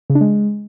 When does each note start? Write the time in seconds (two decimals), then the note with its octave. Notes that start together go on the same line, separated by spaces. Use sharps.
0.10 C#3
0.15 D4
0.21 G#3